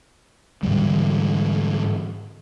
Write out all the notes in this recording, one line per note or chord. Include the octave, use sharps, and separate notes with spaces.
G#2 D3 E3 G3